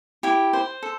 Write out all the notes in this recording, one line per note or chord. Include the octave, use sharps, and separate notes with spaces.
E4 G4 G5
C5
A4